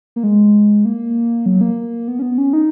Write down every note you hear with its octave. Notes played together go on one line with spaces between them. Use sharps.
A#3
G#3
A#3
F#3
A#3
B3
C#4
B3
C#4
D#4